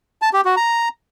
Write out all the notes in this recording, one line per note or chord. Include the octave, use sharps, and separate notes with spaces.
A5
G4
F#4
A#5